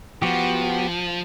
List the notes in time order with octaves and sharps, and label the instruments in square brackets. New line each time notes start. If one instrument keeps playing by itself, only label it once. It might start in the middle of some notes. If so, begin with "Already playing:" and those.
[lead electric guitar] F3 [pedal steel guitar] B3 F#4 G4